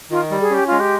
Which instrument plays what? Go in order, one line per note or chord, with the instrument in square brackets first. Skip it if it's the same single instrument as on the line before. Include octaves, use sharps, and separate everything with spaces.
[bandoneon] D#3 [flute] F4
[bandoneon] G3
[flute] G#4
[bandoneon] C#4 [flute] G4
[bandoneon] G#3 [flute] F4
[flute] G4